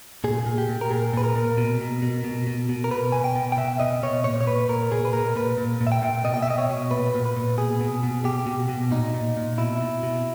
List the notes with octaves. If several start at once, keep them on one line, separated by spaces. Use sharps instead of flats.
A#2 G#4
A#2
G4
A#2
A#4
A#2 G#4
A#2 B4
A#4
A#2
B2
B2
B2
B2
B2
B2
A#4
B2 B4
B2 G#5
G5
B2
G5
B2 E5
B2 D#5
B2 C#5
A#2 C#5
C#5
A#2 B4
A#2 A#4
A#2 G#4
B4
A#2 A#4
A#2 B4
A#2
A#2
E5
G5
A#2
B2 D#5
G5
E5
B2 D#5
C#5
B2
A#2 B4
A#2
B4
A#2
B2 G#4
B2
B2
B2 G4
B2
B2
A#2 D#4
A#2
A#2
B2 E4
B2
B2